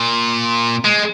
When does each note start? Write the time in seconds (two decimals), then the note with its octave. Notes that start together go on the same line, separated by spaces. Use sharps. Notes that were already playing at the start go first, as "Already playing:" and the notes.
Already playing: A#2
0.85 G#3